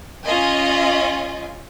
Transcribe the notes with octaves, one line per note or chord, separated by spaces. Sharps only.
C#4 F4 D#5 G#5